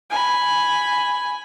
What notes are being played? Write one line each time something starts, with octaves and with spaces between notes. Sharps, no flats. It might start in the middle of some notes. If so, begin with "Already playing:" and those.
G#5 B5